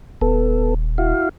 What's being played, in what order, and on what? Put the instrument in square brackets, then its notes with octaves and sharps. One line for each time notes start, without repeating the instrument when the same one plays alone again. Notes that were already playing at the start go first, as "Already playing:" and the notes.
[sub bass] D#1 [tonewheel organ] B3 A4
[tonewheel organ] E4 F#4 F5